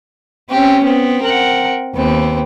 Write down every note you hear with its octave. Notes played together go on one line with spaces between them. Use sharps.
C4 C#4 G4
B3 C4
A#4 F#5
D#2 B3 C4